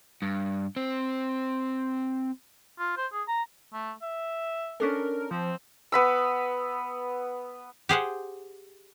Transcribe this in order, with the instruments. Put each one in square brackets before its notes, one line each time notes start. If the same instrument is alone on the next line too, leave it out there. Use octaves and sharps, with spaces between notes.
[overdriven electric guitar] G2
C4
[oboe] F4
C5
G#4
A#5
[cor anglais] A3
E5
[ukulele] C#4 D4 A4 [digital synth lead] A#4
[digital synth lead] F3 [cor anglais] C4
[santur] B3 B5 E6
[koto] G4 G#4 C5 F#5